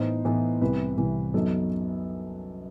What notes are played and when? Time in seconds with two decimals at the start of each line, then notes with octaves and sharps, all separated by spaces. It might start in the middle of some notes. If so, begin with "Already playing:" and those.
Already playing: A2 E3 B3 D#4 C5
0.25 A2 E3 B3 D#4
0.61 C2 C3 E3 B4
0.97 C2 C3 E3
1.34 F#2 F#3 B3 D#4 A4